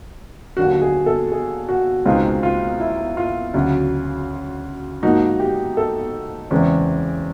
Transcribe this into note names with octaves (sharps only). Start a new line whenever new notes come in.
D#2 D3 F#3 F#4
G#4
A4
G#4
F#4
C#2 B2 G#3 C4 D#4 F4
F4
E4
F4
D2 C#3 F#3
G#2 F3 A#3 D#4 F#4
G4
A4
E2 C#3 E3 G#3 C4